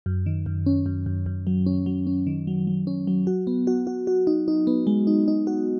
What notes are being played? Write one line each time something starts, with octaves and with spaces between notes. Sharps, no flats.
F#2
D#3
F#2
C#4
F#2
F#2
F#2
F#3
C#4
F#3
C#4
D#3
F#3
F#3
C#4
F#3
F#4
B3
F#4
F#4
F#4
D#4
D#4
B3
G#3
D#4
D#4
F#4